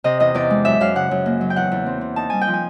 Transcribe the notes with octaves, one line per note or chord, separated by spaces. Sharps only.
C3 D#5
E2 D#5
E2 D5
G#3
F#2 E5
F#2 F5
C#3 F#5
F#2
A#3
F#3
G5
E2 F#5
E2
C4
C4
D#4 A5
G3 G#5
G5
F3
G#5